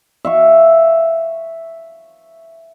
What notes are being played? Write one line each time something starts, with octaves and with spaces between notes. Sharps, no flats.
E5 F5 C#6